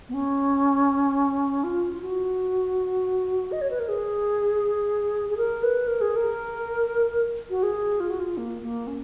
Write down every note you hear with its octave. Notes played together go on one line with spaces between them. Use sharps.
B3
C#4
F4
F4
F#4
D#5
C#5
B4
A#4
G#4
G#4
A#4
B4
A#4
G#4
A#4
F#4
G#4
F4
F#4
F4
A#3
A#3
C#4